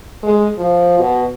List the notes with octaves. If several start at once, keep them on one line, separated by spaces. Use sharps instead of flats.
G#3
F3
B2